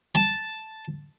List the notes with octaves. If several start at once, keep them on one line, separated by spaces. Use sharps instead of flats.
A5